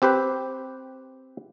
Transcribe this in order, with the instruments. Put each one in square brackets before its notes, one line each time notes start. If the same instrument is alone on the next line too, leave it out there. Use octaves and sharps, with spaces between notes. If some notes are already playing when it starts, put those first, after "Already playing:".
[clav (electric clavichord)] C4 G4 B4 C5